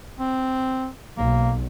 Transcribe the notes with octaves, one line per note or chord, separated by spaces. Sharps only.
C4
B1 A#3